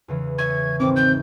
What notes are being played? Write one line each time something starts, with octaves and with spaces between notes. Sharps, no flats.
E2 C#3 E3
C#5 E5 C#6 G#6
G#1 C4 D6
G6